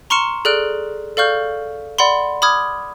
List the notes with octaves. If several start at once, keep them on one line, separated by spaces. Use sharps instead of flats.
A#5 C6 C#6 F6 C#7 E7
G#4 A4 D5 F6 F#6 D7
A4 D5 F5 C#6 F6 G6
D5 F#5 B5 C6
B5 D6 D#6 F6 G#6